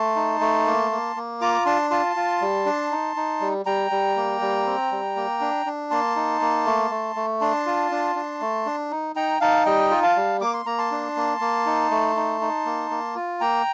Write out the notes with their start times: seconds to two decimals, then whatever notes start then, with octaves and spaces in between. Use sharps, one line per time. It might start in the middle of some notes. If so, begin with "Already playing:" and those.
Already playing: A3 A5 C6
0.16 D#4
0.41 A3
0.67 A#3
0.91 A#3
1.16 A#3
1.41 F4 A#5 D6
1.66 D4 A5 C6
1.91 F4 A5 C6
2.16 F4
2.41 G3
2.66 D4
2.91 D#4
3.16 D#4
3.41 G3
3.66 G3 G5 A#5
3.91 G3
4.16 A#3
4.41 G3
4.66 C4
4.91 G3
5.16 A#3
5.41 D4
5.66 D4
5.91 A#3 A5 C6
6.16 D#4
6.41 A#3
6.66 A3
6.91 A3
7.16 A3
7.41 D4 A5 C6
7.66 F4
7.91 D4
8.15 D4
8.41 A3
8.66 D4
8.91 D#4
9.16 D#4 G5 A#5
9.41 D#4 F5 A5
9.66 G3 D#5 G5
9.91 F4
10.03 F5 A5
10.16 G3
10.41 A#3 D6
10.54 C6
10.66 A#3 A#5
10.78 A5 C6
10.91 D4
11.16 A#3
11.40 A#3
11.66 D#4
11.91 A3
12.16 D#4
12.41 D#4
12.65 A#3
12.91 A#3
13.15 F4
13.41 A#3 G5 A#5